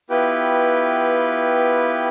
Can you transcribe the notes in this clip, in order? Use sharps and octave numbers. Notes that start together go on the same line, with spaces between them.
B3 E4 F4 G4 B4 G5